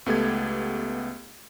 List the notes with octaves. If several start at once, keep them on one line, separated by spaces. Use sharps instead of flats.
C#2 A3 B3 G4 A4 G#6